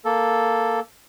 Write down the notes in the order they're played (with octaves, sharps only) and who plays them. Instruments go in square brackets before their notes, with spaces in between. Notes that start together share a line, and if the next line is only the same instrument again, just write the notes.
[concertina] A#3 A4